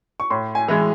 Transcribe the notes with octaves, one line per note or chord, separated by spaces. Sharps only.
C#6
A2 C6
G#5
E3 G#3